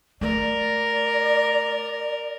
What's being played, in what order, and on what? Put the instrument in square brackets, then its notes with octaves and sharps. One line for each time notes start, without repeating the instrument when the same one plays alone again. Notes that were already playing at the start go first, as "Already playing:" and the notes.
[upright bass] A3 [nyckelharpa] A#4 [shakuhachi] D5